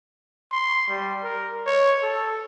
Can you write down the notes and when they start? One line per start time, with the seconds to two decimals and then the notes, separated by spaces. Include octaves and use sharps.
0.52 C6
0.89 G3
1.24 A#4
1.67 C#5
2.03 A4